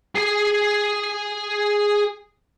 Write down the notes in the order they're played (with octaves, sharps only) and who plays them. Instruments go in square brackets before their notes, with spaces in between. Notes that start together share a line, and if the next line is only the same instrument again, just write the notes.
[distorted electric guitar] G#4 G#5